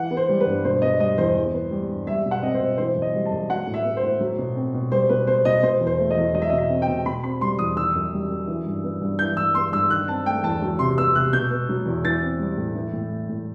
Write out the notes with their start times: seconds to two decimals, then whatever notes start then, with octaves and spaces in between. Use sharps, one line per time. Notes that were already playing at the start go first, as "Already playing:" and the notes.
Already playing: E3 F#5
0.11 B3
0.17 C5
0.29 G3
0.41 B4
0.47 G2
0.65 B2 C5
0.82 B3 D#5
1.00 G3 D#5
1.18 E2 C5
1.35 E3
1.54 B3
1.71 G3
1.89 G2
2.07 G3 E5
2.25 B2
2.31 F#5
2.42 C4 D#5
2.54 C5
2.61 B2
2.78 E3 C5
2.96 F#2
3.02 D#5
3.14 G3
3.26 A5
3.31 F#2
3.49 F#3 F#5
3.67 A2
3.74 E5
3.84 B3
3.97 C5
4.03 A2
4.20 F#3
4.38 B2
4.56 C4
4.74 B2
4.91 G3 C5
5.09 B2 B4
5.27 B3 C5
5.45 B2 D#5
5.63 B2 C5
5.81 E2
5.87 C5
5.99 A3
6.11 D#5
6.17 E2
6.34 F#3 D#5
6.42 E5
6.49 D#5
6.52 B2
6.58 E5
6.70 C4
6.82 G5
6.88 B2
7.06 B2 B5
7.24 C4 B5
7.41 G3 C6
7.59 E2 D#6
7.76 D#3 E6
7.95 F#2
8.13 G3
8.31 F#2
8.47 E3
8.66 G2
8.84 B3
9.02 G2
9.19 E3 G6
9.37 G2 E6
9.55 B3 C6
9.72 G2 E6
9.90 D#3 F#6
10.08 C4 A5
10.26 A3 G5
10.44 E2 A5
10.62 F#3
10.79 C3 C6
10.97 B3 E6
11.15 C3 F#6
11.33 B2 G6
11.50 B3
11.69 F#3
11.86 E2
12.04 E3 A6
12.22 C4
12.39 G3
12.57 A2
12.75 E3
12.93 A2
13.11 A3
13.29 A2